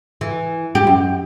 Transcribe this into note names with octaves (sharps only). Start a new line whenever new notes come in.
E3
G4
F#2